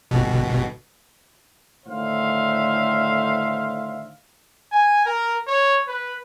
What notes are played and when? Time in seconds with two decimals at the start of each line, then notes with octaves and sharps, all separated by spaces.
0.11 G1 B2
1.86 A2 D3 D#3 C5 E5 F5
4.72 G#5
5.06 A#4
5.47 C#5
5.88 B4